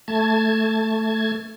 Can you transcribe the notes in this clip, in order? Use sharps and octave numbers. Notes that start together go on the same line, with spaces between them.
A3 A5 G#6